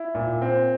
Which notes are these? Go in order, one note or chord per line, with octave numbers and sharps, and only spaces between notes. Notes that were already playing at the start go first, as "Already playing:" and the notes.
Already playing: E4
A#2
C4